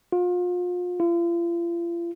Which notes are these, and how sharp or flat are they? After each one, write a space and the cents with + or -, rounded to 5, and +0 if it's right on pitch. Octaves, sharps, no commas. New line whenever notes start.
F4 +35
F4 -40